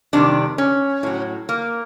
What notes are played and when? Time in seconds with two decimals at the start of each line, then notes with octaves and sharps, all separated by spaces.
0.13 F2 C3 D#3 G3 D4
0.58 C#4
1.03 A2 F#3
1.49 A#3